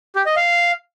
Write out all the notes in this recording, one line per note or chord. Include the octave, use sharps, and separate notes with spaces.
G4
D#5
F5